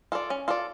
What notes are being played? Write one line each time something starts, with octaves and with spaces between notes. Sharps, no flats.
F4 A4 D5
C#4
F4 A4 D5